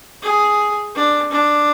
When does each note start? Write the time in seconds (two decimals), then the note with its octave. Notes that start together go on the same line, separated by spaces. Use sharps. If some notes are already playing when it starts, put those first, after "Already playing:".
0.22 G#4
0.95 D4
1.31 D4